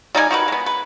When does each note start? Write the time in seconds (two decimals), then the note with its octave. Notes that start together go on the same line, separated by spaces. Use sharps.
0.15 G3 D#4 A4 G#5
0.31 D#4 F#4 A#4 B4
0.48 G#3 B3
0.66 B4